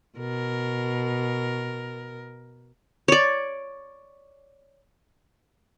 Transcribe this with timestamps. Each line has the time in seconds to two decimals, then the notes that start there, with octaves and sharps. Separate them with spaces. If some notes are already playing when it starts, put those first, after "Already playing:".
0.18 B2 A#4
3.08 C#5 D5